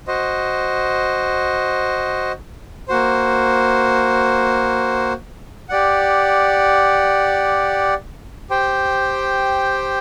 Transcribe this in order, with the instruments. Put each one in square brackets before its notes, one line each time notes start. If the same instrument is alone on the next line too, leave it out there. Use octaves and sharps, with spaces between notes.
[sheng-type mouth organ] F#4 C5 D#5
A#3 F#4 C5
G4 D5 F#5
G4 C5 G5